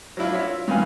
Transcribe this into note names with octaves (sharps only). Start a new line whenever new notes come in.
F#3 D4 E4 F4
F4 C#5 E5
G2 D#3 B3 F5 G#5